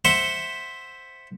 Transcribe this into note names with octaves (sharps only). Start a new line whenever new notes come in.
C5 E5 F#5